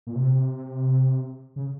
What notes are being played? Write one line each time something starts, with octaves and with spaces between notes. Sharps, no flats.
A#2
C3
C#3